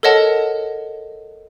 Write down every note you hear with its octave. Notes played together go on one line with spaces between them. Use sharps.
A4 A#4 C#5 D#5 F#5 A5